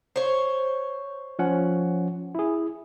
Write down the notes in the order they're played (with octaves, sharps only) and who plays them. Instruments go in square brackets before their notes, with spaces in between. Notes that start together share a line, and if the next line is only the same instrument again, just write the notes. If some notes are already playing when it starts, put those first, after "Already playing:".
[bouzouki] C5 C#5
[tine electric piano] F3 C#4 F#5
E4 G#4